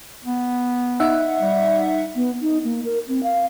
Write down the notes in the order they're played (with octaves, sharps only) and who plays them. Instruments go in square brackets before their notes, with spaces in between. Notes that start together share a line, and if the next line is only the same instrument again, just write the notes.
[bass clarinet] B3
[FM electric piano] D#4 E5 F#5
[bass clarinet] G3
[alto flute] B3
D#4
A#3
A#4
C4
F5